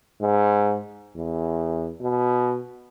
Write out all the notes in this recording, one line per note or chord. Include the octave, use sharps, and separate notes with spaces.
G#2
E2
B2